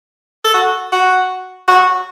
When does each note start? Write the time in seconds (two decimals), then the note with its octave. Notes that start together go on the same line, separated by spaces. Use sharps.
0.44 A4
0.54 F#4
0.92 F#4
1.68 F#4